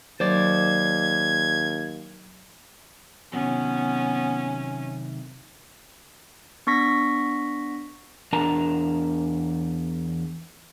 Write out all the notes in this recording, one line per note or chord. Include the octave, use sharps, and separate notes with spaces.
D#2 F#3 C5 D5 G#6
C3 D#3 F#3 B3 C#4
B3 D4 C#6 A#6 B6
E2 D4 A#4 A5 A#5